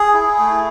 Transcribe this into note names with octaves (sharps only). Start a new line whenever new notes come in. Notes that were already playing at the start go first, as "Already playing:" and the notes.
Already playing: G#4
E4
A3